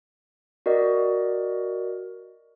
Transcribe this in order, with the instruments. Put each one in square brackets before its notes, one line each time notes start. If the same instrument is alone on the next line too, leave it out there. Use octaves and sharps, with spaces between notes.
[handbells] F#4 A#4 D5 D#5